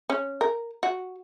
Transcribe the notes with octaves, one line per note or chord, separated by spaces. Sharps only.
C#4
A#4
F#4